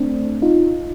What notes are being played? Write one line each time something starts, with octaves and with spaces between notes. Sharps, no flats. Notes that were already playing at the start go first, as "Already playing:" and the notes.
Already playing: A3 C4 D4
D#4 F4